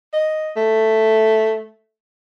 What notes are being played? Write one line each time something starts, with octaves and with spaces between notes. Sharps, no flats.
D#5
A3